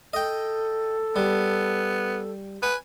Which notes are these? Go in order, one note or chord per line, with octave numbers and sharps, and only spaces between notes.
A4 D#5 G5
G3 B3
B4 G#5